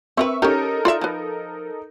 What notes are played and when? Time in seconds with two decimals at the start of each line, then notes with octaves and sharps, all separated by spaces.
0.17 C4 A#4 B4 E5 C#6
0.42 C#4 D#4 G4 A4 A#4
0.85 F4 D5 E5
1.01 F3 B4